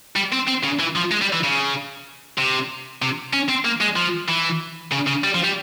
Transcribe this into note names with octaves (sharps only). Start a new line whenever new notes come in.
G3
C4
C4
C#3
E3
F3
G#3
G3
E3
C#3
C3
C3
C#4
C4
A#3
G#3
F3
E3
C#3
C#3
G3
F3
G3